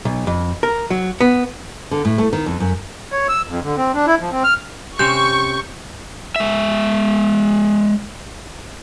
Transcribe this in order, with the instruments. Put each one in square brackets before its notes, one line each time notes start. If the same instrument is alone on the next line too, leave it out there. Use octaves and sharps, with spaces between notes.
[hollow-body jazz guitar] B1
F2
A#4
F#3
B3
[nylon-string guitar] D3
A2
A3
D#3
F2
F#2
[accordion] C#5
E6
F2
D3
C4
D4
E4
F3
C4
F6
[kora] C3 C4 C#4 [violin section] C#6 [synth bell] G6
[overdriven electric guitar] G#3 E5